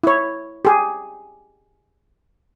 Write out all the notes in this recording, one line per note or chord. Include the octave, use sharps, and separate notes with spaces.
E4 C#5
G4 G#4